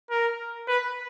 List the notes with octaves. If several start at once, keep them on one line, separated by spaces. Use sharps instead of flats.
A#4
B4